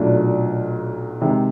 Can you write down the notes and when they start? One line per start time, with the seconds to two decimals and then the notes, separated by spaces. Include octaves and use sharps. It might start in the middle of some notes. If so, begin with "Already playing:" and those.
Already playing: B1 A#2 F#3 A3 D4
1.21 C3 D#3 G#3